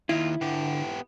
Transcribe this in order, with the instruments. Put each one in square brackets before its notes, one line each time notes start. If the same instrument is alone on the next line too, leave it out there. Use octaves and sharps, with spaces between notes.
[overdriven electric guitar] D#2 D#3 [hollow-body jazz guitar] E4 [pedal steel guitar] F4
[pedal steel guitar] D3 [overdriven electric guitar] B3 G4